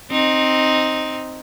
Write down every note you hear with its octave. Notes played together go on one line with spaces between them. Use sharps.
C4 D#4